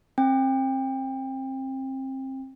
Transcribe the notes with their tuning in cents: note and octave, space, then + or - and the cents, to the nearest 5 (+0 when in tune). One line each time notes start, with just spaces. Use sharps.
C4 +25 G5 +25